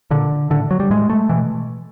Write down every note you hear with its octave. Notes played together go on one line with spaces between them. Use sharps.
A#2 D3
A2 D3
F#3
G3
A2 G#3
A3
B2 E3